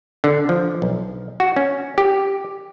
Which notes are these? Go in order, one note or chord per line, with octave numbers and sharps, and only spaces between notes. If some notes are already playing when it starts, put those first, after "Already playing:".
D3
F3
B1
F#4
C#4
G4